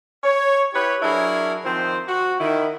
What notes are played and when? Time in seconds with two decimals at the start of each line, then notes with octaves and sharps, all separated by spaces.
0.24 C#5
0.74 E4 G4 B4 C#5
1.03 F#3 D4 E4 G#4 A#4 C#5
1.65 D#3 F3 C4 C5
2.08 F#4
2.39 D#3 E4